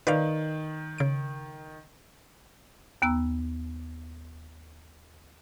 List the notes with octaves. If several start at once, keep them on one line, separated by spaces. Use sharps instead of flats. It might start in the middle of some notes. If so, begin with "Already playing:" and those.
D#3 B4 D5 F5
C#3 D7
D#2 B3 A#5 E6